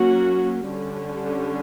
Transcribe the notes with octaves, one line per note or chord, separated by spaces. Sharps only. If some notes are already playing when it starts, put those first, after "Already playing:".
Already playing: F#3 A#3 C#4 F#4
D3 G3 C#4